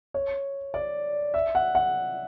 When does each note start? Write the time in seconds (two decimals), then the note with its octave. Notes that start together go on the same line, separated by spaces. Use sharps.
0.14 C#5
0.74 D5
1.34 E5
1.55 F#5
1.75 F#5